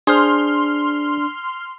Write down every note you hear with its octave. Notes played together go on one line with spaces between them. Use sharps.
D4 G#4 C5 C6 F6